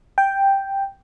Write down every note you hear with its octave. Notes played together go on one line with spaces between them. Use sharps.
G5